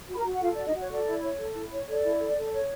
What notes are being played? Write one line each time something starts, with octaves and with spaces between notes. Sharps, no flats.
F#4 B5
A#4 A#5
F#4
F#5
F4 A4 F5
F#4 D5
D#4 D#5
F#4
C#5
A4 D5
E4
C#5
A4
E4
C#5
A4 D5
E4
A4
A4
C#5